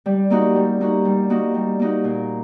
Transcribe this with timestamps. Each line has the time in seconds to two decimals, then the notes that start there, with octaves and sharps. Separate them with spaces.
0.06 G3
0.30 A#3 D#4 F#4
0.55 G3
0.81 A#3 D#4 F#4
1.05 G3
1.30 A#3 D#4 F#4
1.54 G3
1.80 A#3 D#4 F#4
2.04 A#2